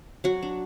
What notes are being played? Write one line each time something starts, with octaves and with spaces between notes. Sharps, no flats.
F#3 F#4
D4